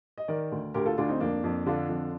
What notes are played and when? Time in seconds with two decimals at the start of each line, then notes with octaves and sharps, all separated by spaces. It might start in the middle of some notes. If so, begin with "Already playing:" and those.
0.18 D#5
0.28 D#3 A#4 D5
0.52 D2
0.74 D2 G4 A#4
0.86 F4 A4
0.98 D2 D4 F4
1.09 C4 D#4
1.20 F2 A#3 D4
1.44 F2
1.66 D3 D4 F4
1.89 F2